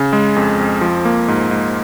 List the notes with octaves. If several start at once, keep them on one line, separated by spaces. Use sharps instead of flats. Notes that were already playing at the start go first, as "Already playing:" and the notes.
Already playing: C#3
G#3
F2
F2
F3
A#3
G#2
G#2